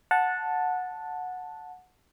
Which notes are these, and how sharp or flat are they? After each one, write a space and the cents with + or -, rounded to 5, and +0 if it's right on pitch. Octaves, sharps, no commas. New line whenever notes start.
F#5 -15 A5 +0